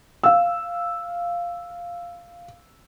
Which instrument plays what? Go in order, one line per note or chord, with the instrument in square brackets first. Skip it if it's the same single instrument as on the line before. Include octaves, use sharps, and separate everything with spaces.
[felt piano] F5 E6